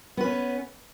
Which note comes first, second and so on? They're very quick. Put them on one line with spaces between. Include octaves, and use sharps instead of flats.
B3 B4 C#4